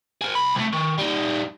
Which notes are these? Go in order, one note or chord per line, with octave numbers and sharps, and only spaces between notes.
G#4 A#4
C2 B5
C2 A3
D#3
G3 D#4